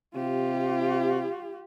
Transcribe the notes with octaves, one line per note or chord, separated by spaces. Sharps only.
C3 F4 G4